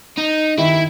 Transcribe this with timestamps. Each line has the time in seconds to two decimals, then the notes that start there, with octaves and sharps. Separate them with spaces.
0.17 D#4
0.58 D#3 E4